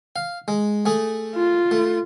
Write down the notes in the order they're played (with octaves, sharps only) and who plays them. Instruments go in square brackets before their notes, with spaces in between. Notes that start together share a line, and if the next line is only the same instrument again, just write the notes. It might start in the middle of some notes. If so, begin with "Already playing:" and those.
[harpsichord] F5
G#3
A3 G#4
[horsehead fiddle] F4
[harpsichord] A3